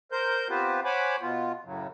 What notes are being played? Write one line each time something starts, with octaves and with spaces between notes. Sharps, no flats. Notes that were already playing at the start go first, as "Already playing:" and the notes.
A#4 C5 G6
B3 C4 F4 G4 B4 C5
C5 C#5 F#5 G#5 B5 D6
B2 B3 F4
F#2 A2 C#3 F#3